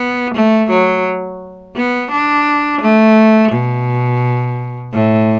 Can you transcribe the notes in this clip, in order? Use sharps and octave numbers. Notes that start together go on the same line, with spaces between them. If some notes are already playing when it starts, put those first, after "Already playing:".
Already playing: B3
A3
F#3
B3
D4
A3
B2
A2